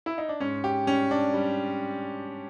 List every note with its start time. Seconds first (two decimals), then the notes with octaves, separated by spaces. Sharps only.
0.06 E4
0.18 D#4
0.29 D4
0.40 G#2 C#4
0.64 G4
0.87 G3 C#4
1.11 D4
1.34 G3